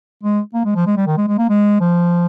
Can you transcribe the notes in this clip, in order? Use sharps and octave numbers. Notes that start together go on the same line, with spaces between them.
G#3
A#3
G#3
F3
G#3
G3
D#3
G#3
G#3
A#3
G#3
F3